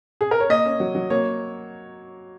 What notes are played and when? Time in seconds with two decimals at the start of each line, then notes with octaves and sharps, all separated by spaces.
0.21 G#4
0.31 A#4
0.40 C#5
0.50 A#3 D#5
0.65 C#4
0.80 F#3
0.95 F#3
1.10 A#3 C#5